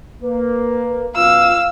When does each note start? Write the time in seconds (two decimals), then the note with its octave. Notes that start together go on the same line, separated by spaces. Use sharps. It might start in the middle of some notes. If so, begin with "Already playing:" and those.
0.22 A#3 B4
1.16 F#2 B2 F4 B4 F5 E6